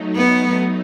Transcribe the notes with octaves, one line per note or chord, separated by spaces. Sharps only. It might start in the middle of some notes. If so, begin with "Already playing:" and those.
Already playing: F#3 A3 D#4
B3